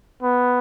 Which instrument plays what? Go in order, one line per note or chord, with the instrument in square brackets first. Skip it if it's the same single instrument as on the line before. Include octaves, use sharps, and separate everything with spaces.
[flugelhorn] B3